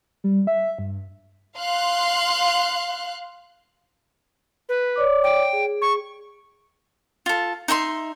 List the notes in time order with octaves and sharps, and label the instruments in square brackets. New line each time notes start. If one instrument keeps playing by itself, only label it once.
[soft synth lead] G3
E5
G2
[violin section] F5 C6 F#6
[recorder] B4
[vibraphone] C#5 D5 D6
[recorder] G5
[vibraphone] G#4
[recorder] C#6
[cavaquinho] F4 A4
D#4 E5 G5 C6